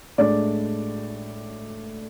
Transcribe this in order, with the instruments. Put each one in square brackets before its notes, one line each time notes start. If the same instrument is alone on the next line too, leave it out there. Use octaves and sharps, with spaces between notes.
[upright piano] A2 G#3 D4 D5